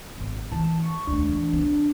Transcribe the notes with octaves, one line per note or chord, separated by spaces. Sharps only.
G#1
E3 D#4 A5
C#6
D#2 A3 D4
E3
C4